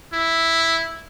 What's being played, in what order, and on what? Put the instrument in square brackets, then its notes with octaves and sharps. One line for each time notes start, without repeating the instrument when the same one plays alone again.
[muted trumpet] E4